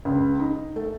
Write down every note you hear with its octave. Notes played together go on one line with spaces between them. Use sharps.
C#2
D#4
A3